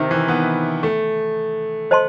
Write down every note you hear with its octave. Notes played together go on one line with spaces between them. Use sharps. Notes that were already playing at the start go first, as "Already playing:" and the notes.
Already playing: C3 D#3 D#4 C5 E5
E3
B3
A3
C5 D#5 A5 C6